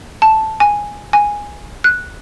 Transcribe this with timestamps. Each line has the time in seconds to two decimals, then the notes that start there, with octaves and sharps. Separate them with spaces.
0.22 A5
0.60 G#5
1.13 G#5
1.84 F#6